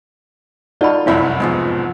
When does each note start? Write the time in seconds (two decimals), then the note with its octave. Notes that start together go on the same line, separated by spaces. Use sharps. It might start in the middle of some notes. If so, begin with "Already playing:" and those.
0.81 D#4 F4 F#4 A4 D5 B5
1.07 F1 C2 F#2 E4 C#5 E5 B5
1.40 G#2 B2 F3